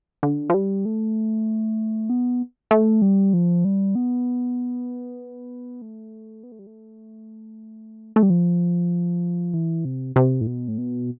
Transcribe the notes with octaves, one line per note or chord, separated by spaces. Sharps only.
D3
F3
G3
A3
B3
A3
G3
F3
G3
B3
A3
B3
A3
G3
A3
A3
G3
F3
E3
C3
C3
A2
B2
A2
B2